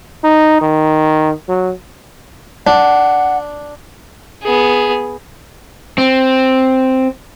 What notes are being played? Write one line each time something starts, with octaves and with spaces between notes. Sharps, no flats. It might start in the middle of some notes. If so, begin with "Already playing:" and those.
D#4
D#3
F#3
D4 F#5
B3 G#4
C4